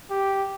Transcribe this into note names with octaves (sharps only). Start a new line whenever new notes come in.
G4